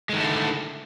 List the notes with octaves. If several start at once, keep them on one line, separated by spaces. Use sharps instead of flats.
D3 D#3 G#3 A3 E4